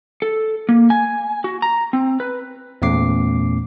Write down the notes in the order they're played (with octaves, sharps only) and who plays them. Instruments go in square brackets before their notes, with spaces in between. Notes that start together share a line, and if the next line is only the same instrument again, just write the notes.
[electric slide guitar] A4
A#3
G#5
F#4
A#5
C4
B4
[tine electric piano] E2 A#2 A3 C#4 D6 C7